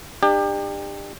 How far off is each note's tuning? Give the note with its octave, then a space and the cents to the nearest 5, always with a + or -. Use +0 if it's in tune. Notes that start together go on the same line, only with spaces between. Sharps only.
D4 +35 G4 +30